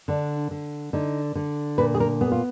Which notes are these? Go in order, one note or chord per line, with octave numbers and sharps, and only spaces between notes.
D3 D4
D3
D3 D#4
D3
A#2 B4
G#4
A#4
B3 G#4
F4